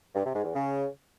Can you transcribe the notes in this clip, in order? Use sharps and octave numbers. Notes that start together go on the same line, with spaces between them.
G2
C3
G#2
E2
C#3